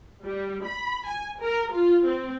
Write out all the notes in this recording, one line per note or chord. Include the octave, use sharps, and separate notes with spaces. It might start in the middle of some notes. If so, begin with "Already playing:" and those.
G3
B5
G#5
A#4
F4
C4